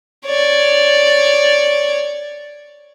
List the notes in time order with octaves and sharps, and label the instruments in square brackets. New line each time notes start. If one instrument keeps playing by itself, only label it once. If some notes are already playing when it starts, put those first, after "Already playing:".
[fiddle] C#5 D5